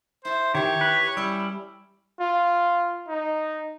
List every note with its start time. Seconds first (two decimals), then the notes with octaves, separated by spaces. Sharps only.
0.25 E4 C5 A5
0.55 D#3 E3 E4 G4 C#5
0.81 B4
1.17 G3 C#4 E4 A4 G5
2.20 F4
3.08 D#4